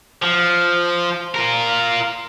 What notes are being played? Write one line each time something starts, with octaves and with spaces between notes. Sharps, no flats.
F3
F4 A#4